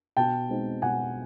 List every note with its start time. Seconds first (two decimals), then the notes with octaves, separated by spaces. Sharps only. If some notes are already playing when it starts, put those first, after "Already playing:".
0.17 B2 G5 A5
0.49 G#3 C4 D#4
0.82 B2 F#5 G#5